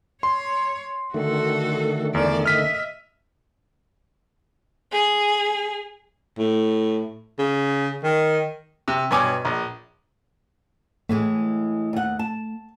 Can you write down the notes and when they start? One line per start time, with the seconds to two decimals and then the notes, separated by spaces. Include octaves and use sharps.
0.23 C#5 C6
1.14 D3 D#3 A3 F#4 A4
2.14 E2 D5
2.46 D#5 E5 F6 B6
4.92 G#4
6.39 A2
7.39 C#3
8.03 D#3
8.88 C3
9.11 G2 B2 C#5 G#5 D6
9.45 A#1
11.09 A2 E3 G#3 A3
11.93 D#2 F#5
12.19 A5